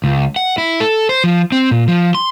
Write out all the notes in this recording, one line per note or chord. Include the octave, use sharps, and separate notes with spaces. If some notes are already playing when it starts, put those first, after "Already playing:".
C#2
F#5
E4
A4
C5
F3
C4
A#2
F3
C6